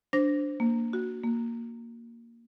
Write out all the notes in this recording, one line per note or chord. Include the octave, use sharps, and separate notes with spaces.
D4 C5 A#6
A#3
F#4
A#3